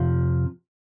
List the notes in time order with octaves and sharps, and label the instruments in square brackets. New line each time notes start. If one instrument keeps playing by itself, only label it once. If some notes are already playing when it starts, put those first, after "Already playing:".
Already playing: [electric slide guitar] F2 C3 F3